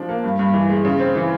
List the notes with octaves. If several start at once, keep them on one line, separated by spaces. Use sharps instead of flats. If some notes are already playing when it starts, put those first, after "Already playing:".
Already playing: F3 D4
A#3
G2
G2
E3
G#3
C#3
C4
E3